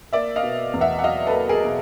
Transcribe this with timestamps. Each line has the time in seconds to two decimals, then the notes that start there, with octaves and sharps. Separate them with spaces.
0.13 A#3 D5 E5
0.36 D#5 F5
0.43 B2
0.74 E2
0.81 E5 F#5
0.99 F#5
1.03 F#3 D#5 F5
1.27 A4 B4
1.34 A#3
1.49 G#4 A#4
1.64 B2